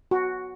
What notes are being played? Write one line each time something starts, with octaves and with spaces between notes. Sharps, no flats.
F#4